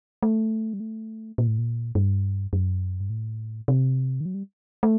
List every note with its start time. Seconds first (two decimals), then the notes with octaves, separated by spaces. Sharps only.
0.23 A3
0.73 G3
0.80 A3
1.38 A#2
1.47 A2
1.58 A#2
1.95 G2
2.53 F#2
3.00 G2
3.10 A2
3.68 C3
4.21 D#3
4.26 F#3
4.34 G3
4.83 A3